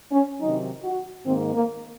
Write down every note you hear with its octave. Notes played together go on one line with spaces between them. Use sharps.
C#4
C3 D#3 F#3 D#4
F#4
G#2 D#3 A#3 C4
A#3